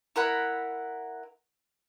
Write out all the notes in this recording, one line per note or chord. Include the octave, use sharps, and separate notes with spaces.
E4 A#4 F#5 B5